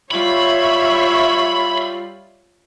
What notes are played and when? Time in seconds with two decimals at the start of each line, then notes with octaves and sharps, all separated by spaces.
0.11 G3 F4 C#5 E5 B5